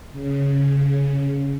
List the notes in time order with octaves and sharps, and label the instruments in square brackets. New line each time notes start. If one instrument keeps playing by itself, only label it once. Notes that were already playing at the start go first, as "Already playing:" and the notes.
[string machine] C#3